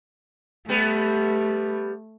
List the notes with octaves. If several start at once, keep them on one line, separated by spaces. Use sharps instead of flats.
G3 A3 B3